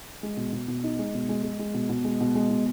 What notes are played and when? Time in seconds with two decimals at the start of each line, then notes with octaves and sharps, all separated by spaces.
0.23 G#3
0.37 B2
0.53 B2
0.68 B2
0.84 D#4
0.99 G#3
1.14 B2
1.29 G#3
1.43 G#3
1.59 G#3
1.74 B2
1.89 B2
2.04 G#3
2.21 B2
2.35 G#3
2.50 B2